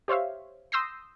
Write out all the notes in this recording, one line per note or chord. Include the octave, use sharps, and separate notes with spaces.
G4 C5 C#5 E5 F5
C6 D#6 E6 G6 A#6 C7